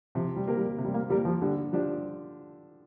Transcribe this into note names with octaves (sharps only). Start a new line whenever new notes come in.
C3 F3
G3
A#3 G4 A#4
G3
C3
G3
A#3
G3 A#3 G4 A#4
F3
D3 G3
F3 D4 G4